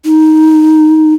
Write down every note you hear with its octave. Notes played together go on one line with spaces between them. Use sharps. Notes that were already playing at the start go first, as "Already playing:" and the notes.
D#4